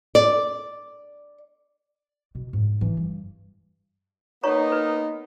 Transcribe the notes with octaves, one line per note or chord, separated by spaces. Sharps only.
D5
B2
G#2
E3 D4
G2
A#3 B3 D#4 C#5 A#5 C#6
B4